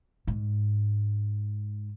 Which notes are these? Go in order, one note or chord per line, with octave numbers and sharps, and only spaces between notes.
G#2